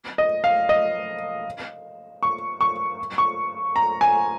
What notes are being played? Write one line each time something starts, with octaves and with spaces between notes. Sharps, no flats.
D#5
F5
D#5
C#6
C#6
C#6
A#5
G#5